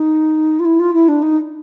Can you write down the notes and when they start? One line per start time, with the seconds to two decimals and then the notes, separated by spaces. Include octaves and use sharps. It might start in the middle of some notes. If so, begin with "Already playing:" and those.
Already playing: D#4
0.59 F4
0.65 E4
0.79 F4
0.93 E4
1.08 D4
1.22 D#4